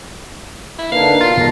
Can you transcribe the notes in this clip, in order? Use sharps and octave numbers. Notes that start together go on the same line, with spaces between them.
E4
D3 A#3 D4 D#4 B4 F5
B2 F4
B1 G#3 A#4 A5 A#6